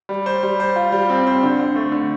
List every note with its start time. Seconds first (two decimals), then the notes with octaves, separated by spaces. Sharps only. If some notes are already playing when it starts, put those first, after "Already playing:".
0.09 G3
0.26 C5
0.43 G3
0.60 C5
0.76 F4
0.92 G3
1.09 C4
1.27 C5
1.43 D3
1.60 D3
1.76 A3
1.92 D3